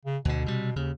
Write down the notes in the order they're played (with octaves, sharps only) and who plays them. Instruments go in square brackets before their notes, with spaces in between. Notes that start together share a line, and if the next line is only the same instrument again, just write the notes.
[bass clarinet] C#3
[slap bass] D2 D3 [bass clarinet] B2
[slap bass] C3 G3
[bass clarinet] D#2 [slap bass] C#3